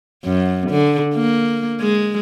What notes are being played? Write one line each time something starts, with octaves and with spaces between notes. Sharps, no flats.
F#2
D3
A#3
G#3